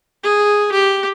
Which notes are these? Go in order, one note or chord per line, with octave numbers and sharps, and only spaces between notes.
G#4
G4